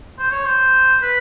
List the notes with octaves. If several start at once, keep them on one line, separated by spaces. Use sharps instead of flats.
C5
C#5
C5
B4